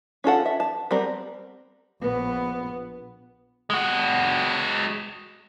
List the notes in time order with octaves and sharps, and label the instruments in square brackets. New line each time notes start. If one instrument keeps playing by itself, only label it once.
[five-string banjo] C#4 F4 A4 F#5
E5
A5
G3 B3 C4 A#4
[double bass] A#1 B3
[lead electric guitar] G#3 F#4